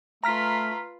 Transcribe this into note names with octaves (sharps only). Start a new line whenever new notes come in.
A3 F4 B4 A#5 F6 B6